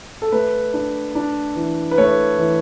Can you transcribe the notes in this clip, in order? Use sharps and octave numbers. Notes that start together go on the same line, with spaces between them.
A4
A3 B4
D4
D4
E3
B4
A3 C#5
E3